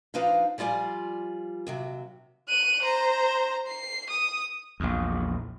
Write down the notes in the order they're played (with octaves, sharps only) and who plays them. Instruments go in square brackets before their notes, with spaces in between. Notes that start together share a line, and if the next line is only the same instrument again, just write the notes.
[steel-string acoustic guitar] F3 D4 D#4 B4 C5 F5
F3 G3 F4 D5 G#5
D#2 C3 F#3
[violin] F#6 D#7
C5 A#5
C7
D#6
[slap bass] A#1 E2